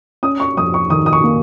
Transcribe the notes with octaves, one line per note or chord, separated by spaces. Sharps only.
C#4 D#6
C#6
F2 D#6
C#6
D#3 D#6
D#6
C#6
A#3